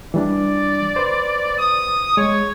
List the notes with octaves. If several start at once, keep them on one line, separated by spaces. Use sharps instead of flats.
E3 G3 D4 D5
B4 C5
D#6
G#3 C#5